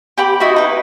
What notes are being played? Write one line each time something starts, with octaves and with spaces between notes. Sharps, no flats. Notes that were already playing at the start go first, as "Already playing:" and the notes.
G4 G5 B5 D6
D#4 E4 F#4 B5
D#4 B4